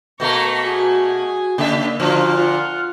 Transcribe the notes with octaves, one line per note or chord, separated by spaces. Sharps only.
B2 A3 A#3 A#5 C#6 A#6
F#4 G#4 G#5
C#3 A#3 E5
A#2 D3 F3 F#4 F6
F4 F#5